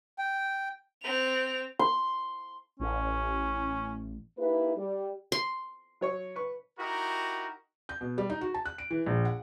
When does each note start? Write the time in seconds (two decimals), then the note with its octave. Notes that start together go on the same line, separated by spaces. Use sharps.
0.18 G5
1.03 C4 F7
1.79 C6
2.80 A1 C#4
4.38 A#3 D#4 E4 G4 B4
4.77 G3 G4
5.32 C6
6.01 F#3 C#5 C#6
6.36 B4 C#6
6.79 D#4 E4 F#4 G4 A#4
7.89 G6
8.01 B2
8.18 G3
8.30 D#4
8.41 F#4
8.54 A5
8.65 F#6
8.78 D7
8.90 E3
9.06 A#1
9.25 F#5